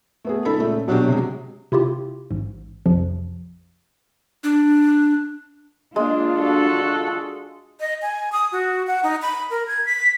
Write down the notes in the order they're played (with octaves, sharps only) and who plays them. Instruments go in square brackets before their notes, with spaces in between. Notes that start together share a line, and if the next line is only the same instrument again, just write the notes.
[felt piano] A3 B3 G#4
[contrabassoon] C#2 [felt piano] D#4 A4 B5
[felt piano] A#2 A3
[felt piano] B2 D4 G4 [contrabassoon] F#3
[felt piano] C3 F#3 G#3
[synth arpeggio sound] C3 E4 F4 G4
A1 G#2
A#1 F2 C3 F3
[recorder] D4
[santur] G#3 [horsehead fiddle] A#3 [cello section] D4 F4
[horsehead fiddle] F#4 A4
[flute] D#5
G#5
D#6
F#4
F#5
D#4
B5
A#4
G#6
B6